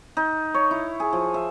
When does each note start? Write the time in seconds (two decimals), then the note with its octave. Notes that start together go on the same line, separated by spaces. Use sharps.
0.17 D#4
0.54 C#5
0.71 E4
1.00 G#4
1.13 F3
1.34 E5